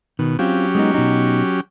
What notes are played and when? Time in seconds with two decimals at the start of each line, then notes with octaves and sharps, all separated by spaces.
0.19 B2 D#3
0.39 F#3 C4 C#4 F4 G4
0.75 G#3 B3 D#4
0.94 B2 D#4